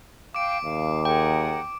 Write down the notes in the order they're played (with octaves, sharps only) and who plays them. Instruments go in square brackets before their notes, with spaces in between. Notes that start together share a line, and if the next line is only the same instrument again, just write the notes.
[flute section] F5 G5 [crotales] D6 D7
[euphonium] D#2 [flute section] F5
[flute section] G#4 A#4 F#5 [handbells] G5